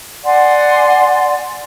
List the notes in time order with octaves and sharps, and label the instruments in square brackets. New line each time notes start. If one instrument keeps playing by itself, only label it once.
[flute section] D5 F#5 G#5 C6